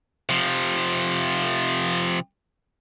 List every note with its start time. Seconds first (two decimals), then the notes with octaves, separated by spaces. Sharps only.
0.29 C3 F3